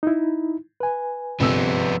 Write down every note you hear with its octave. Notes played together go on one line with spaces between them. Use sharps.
D#4 E4
B4 G#5
G1 C3 F3 B3 E6